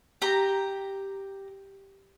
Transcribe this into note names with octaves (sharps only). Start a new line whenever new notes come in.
G4 A#5